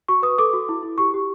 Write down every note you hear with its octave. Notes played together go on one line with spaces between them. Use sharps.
F#4 C#6
B4 D#6
A4 D6
F#4
E4
E4
G4 C#6
G4